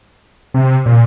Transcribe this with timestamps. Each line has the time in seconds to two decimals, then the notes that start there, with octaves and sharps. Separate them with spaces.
0.54 C3
0.86 A#2